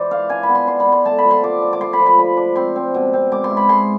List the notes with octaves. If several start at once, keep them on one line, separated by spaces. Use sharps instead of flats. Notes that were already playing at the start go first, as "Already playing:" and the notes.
Already playing: E3 C5 D5
D4 F5
D4 G#5
B5
B3
C6
D4 C6
B5
B3
C6
A3 A5
B5
F3
C6
D4 D6
D4
D6
A3 C6
B5
F3
B5
D4 B5
D4
C4 C6
C4
B2
C4
G#3 D6
C6
E4
B5
G#3 C6